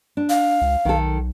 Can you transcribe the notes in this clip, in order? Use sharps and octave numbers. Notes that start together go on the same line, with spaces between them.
D4
F5
C#2
B1 D#3 A4